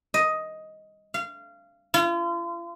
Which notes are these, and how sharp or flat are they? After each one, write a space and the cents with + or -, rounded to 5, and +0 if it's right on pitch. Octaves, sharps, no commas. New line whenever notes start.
D#5 +10
F5 -25
F4 -40